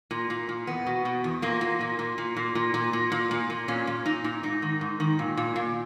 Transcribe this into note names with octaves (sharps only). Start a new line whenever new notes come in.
A#2
A#2
A#2
E2 B3
B2
B2
E2
A#2 A#3
A#2
A#2
A#2
A#2
A#2
A#2
A#2
A#2
A#2
A#2
A#2
A#2 C#4
A#2
A#2 D#4
A#2
G#2 D#4
D#3
G#2
D#3
A#2
A#2
A#2